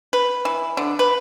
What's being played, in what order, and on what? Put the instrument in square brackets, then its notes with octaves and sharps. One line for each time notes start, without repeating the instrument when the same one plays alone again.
[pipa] B4
E3
D3
B4